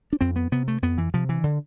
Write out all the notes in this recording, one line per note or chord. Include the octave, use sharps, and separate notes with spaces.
D4
F2 C4
B3
C3 B3
A3
F2 B3
E3
C3 F3
E3
D3